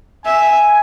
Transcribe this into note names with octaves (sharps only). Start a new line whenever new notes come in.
E5 G#5